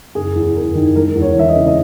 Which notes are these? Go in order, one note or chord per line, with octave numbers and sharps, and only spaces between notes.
F#1 G#4
E2
F#1 A#4
D#3
E1 A#4
E2
C#5
E3 E5
D#5
C#3
D#5